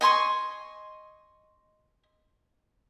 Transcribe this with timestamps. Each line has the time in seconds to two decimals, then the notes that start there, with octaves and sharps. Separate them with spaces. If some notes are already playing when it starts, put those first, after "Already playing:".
0.01 D#5 G#5 C6 C#6